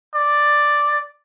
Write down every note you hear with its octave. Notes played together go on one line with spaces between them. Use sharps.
D5